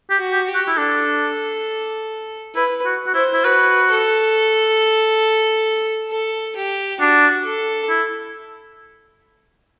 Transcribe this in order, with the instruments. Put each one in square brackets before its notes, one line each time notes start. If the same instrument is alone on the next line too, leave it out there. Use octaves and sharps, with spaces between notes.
[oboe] G4
[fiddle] F#4
[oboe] G4
[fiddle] G4
[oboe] F#4
E4
[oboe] D4 [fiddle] A4
[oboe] E4 [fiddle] B4
[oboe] F#4
F#4
[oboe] E4 [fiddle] C5
[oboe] E4
[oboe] F#4 [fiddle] B4
[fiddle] A4
A4
G4
[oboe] D4 [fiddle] F#4
[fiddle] A4
[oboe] E4